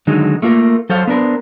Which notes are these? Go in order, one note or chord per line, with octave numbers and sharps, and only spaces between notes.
D3 D#3 F#3 G#3 D#4
A3 A#3 F4 G#4 A#4
F#3 A4 C5 C#5 F5
B3 D4 A#4 C5